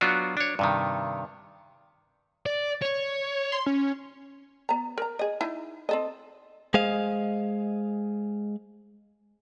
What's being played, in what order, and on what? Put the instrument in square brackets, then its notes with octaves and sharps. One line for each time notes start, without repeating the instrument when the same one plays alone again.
[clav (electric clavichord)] F#3 B3 D4 F4 F#4
D4 C#5
G2 C3 D#3
[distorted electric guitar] D5
C#5
[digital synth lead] C6
C#4
[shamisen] B3 A#5
A#4 A#5
G#4 D#5
D#4 E4
C4 A4 D#5
[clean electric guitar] G#3 G#4 C5 D#5 F5